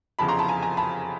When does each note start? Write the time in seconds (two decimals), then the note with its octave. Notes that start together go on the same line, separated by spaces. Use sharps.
0.19 F1 E2 C#3 F3 A5 B5
0.28 A#5 C6
0.39 A5 B5
0.48 G#5 A#5
0.62 G#5 A#5
0.77 A5 B5